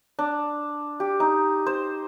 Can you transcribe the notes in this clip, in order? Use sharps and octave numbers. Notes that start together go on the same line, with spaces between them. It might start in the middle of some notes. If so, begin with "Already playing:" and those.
D4
G4
D#4
C5